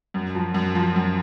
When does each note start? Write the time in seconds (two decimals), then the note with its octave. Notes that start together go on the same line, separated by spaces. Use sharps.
0.14 F#2
0.35 F3
0.54 F#2
0.75 F3
0.96 F#2